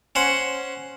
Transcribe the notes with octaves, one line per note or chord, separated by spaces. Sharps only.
C#4 C5 F#5